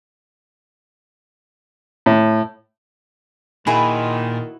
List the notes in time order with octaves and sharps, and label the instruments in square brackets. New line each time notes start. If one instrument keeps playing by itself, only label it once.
[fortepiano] A2
[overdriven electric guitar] A#2 [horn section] D#3 [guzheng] E4 F#4 B4 [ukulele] G#4